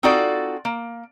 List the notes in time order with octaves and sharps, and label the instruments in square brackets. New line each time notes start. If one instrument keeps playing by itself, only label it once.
[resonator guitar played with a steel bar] C4 D#4 F4 F#4 A4 D5
A#3